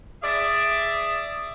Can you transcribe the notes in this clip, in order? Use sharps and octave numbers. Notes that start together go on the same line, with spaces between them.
G#4 D5 E5